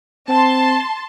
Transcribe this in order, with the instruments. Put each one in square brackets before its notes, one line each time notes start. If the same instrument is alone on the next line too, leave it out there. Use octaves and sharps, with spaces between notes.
[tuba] C4 [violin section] A5 C6